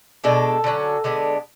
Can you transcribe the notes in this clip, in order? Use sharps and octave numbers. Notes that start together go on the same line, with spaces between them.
B2 G#3 D4 A4
D3 F#3 C#4
D3 G#3 B3 D4